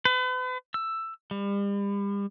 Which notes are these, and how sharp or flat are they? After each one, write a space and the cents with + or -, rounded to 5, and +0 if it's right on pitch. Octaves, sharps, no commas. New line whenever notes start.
B4 +40
E6 +10
G3 +40